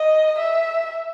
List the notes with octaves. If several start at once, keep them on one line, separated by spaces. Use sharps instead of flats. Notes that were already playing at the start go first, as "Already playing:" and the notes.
Already playing: D#5
E5